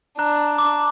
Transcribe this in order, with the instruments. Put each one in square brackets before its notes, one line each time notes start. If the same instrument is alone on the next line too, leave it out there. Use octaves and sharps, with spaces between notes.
[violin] D4 [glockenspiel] A#5 F#6
[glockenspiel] D6